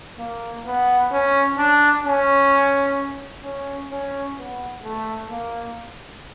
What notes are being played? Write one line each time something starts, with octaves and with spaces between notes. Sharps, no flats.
A#3
B3
C#4
D4
C#4
C#4
C#4
B3
A3
A#3